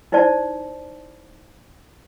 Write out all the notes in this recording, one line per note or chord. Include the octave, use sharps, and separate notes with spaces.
D#4 E4 C5 D5 A5